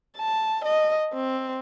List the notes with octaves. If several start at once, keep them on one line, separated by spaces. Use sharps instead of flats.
A5
D#5
C4